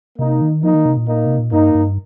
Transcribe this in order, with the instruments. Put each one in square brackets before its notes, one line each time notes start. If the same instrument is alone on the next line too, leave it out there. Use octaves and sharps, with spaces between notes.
[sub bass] C3 [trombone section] A#3 D#4
[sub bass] D#3
[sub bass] F3 [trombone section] A#3 D#4
[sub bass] D#3
C3
A#2
[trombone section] A#3 D#4
[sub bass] C3
A#2
[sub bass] G2 [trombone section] A#3 D#4
[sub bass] G2